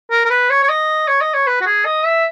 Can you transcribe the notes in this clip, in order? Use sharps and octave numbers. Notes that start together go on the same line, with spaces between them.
A#4
A#4
B4
C#5
C#5
D#5
C#5
D#5
C#5
B4
F#4
G#4
D#5
E5